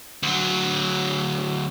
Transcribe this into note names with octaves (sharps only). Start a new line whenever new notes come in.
D2 F#3